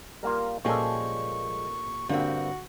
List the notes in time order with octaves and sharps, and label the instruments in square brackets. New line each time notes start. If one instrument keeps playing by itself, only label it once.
[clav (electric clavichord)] G3 A#3 F4 [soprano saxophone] A#4
[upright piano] A#2 [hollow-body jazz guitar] F3 G#3 [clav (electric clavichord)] G3 C#4 A4 [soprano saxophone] C#6
[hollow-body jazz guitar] G2 A#3 C4 [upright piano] D3 [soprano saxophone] F#4